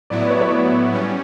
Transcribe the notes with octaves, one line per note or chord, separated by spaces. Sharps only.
A2 F#3 B3 E4 D5
D5
C#5
C#5
D5
G3 C#4